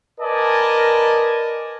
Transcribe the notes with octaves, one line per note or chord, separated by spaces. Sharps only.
A#4 B4 D5 D#5 G#5 A5